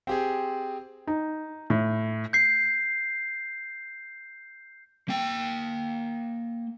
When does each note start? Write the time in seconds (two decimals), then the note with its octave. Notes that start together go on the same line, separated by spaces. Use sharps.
0.07 C4 G4 G#4
1.07 D#4
1.70 A2
2.33 G6 C7
5.09 A#3 G5